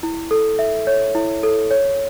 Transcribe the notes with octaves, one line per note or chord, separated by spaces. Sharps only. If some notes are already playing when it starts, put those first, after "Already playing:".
E4
A4
E5
C#5
E4
A4
C#5